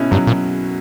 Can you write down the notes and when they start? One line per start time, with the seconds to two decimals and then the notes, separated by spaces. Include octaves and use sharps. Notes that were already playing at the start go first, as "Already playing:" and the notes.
Already playing: B2 C#4 E4
0.11 G2 F#3
0.27 A#2